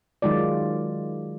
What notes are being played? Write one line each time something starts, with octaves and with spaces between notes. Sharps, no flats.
D#3 F#3 G#3 F4 D5
F4